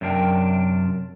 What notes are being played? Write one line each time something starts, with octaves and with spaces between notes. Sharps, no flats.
F#2 C3 D4 A#4 G5